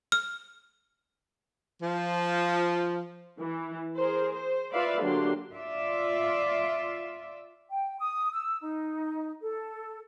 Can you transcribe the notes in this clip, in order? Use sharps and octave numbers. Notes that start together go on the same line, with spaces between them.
F6
F3
E3
G#4 A#4 C5
C5
F4 B4 D5 E5 F5 B5
D3 F#3 A#3 D4 G4 C6
F4 D5 E5
G5
D#6
E6
D#4
A4